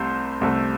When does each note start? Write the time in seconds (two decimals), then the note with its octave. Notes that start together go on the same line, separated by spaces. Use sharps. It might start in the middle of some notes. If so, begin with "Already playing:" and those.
Already playing: C2 C3 A3 C5
0.41 C2 C3 A3